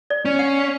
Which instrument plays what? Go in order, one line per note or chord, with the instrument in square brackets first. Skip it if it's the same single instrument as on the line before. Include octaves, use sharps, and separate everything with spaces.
[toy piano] D5
[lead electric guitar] C#4
[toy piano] F#5